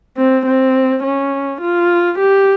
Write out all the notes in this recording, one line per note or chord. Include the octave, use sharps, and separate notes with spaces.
C4
C4
C#4
F4
G4